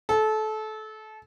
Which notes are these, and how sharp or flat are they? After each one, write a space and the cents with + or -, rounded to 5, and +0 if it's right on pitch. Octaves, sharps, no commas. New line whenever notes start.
A4 -25